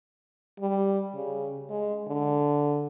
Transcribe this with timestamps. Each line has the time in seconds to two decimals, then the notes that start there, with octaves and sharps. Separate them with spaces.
0.59 G3
1.14 C#3
1.70 G#3
2.07 D3